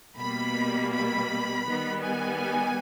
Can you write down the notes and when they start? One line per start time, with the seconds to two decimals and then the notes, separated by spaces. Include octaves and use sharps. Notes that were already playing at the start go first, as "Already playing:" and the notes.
0.18 B2 G3 A#3 B5
0.92 B5
1.66 D#3 G3 B3
2.03 G#5